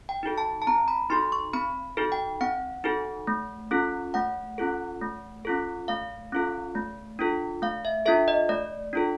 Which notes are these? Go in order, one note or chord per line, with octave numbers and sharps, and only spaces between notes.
G5
D#4 F#4 A4
A5
A5
C4 A#5
B5
D#4 F#4 A4 C6
C#6
C4 B5
D#4 F#4 A4
G5
C4 F#5
D#4 F#4 A4
A3
C#4 F4 A4
A3 F#5
C#4 F4 A4
A3
C#4 F4 A4
A3 F5
C#4 F4 A4
A3
D4 F4 A4
A3 F5
E5
D4 F4 A4 E5
D#5
A3 D5
D4 F4 A4